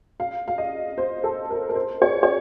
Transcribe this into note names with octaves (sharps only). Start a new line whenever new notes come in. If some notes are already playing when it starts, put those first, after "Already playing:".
F5
F5
D#5
C5
A4
A#4
A#4
C5
C#5
C#5